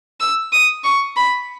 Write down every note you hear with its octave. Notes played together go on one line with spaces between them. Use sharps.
E6
D#6
C#6
B5